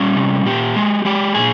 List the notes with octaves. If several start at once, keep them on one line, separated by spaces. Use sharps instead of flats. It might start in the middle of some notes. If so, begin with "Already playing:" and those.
Already playing: G3 C#4
C3
A#2 G4
G#3
G#3 G4
A#2 G#4